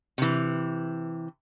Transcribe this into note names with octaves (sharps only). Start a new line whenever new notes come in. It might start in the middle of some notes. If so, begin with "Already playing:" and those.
C3 E3